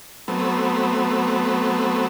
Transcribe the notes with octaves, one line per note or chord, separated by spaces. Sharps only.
F#3 A3 B3 C4